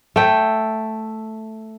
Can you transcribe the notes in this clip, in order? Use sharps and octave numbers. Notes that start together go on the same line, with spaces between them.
A3 G5